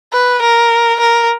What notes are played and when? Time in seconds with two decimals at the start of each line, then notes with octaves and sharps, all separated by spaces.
0.13 B4
0.42 A#4
1.00 A#4